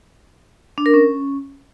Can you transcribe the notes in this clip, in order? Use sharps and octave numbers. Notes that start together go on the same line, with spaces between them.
D4
A#4
C#4